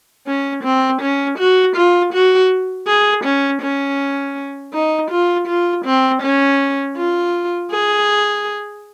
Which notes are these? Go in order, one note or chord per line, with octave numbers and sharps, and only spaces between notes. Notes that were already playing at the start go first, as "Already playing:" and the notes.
C#4
C4
C#4
F#4
F4
F#4
G#4
C#4
C#4
D#4
F4
F4
C4
C#4
F4
G#4